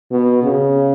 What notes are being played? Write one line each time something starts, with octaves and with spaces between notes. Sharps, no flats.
B2
C#3